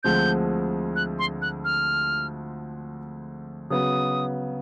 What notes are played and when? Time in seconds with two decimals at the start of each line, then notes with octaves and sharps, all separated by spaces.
0.03 D2 D3 F3 G#3 C4 G6
0.96 F#6
1.19 C6
1.42 F#6
1.65 F6
3.70 C#3 F#3 B3 D#6